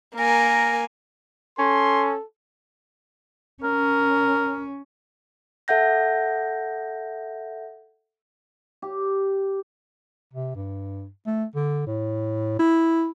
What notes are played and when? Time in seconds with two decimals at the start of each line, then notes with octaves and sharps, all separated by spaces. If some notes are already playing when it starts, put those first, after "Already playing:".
0.17 A#3 A#4 G#5
1.59 C#4 A4 C6
3.63 C#4 A#4
5.68 A4 E5 F#5 G6 A#6
8.82 G4
10.33 C3
10.55 G2
11.26 A3
11.56 D3
11.87 A2
12.59 E4